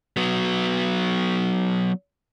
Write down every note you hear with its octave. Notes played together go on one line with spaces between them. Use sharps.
F#3 B3